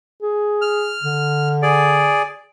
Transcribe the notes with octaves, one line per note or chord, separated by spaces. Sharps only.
G#4
F6
D3
G#4 D5